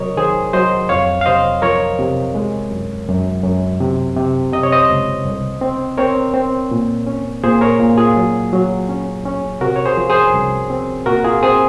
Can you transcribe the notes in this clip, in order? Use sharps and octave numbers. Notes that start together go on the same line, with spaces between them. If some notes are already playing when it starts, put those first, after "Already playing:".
Already playing: C3 F#3 A#4 C#5 D#5
D#3 G#4 C5
F#3 C5 D#5
F2 C#5 F5
F5
C3 C5 D#5
F3 A#4 C#5
C3
G#3
F#2
F#2
F#2
C3
C3
C3 D#5
C#5
C5 D#5
C#2
C2
C4
C4 A#4 C#5
C4
A#2
C#4
A#2 G#4 C5
A#4 C#5
A#2
F4 G#4
F#3
F#3
C#4
C#4
C3 F#4 A#4
C#5
G#4 C5
F3
G#4 C5
C2
C4
A#2 F#4 A#4
F4 G#4
C4 G#4 C5